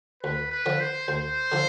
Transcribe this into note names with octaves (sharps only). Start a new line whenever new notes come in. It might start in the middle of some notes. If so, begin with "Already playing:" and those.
D2 B4
B4
D3 F3
C5
D2 C5
D3 F3